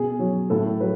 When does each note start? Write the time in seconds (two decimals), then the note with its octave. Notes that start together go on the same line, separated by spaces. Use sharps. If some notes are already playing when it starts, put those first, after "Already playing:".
Already playing: B2 G#4
0.19 F#3
0.50 A2 A4
0.80 F#3 B4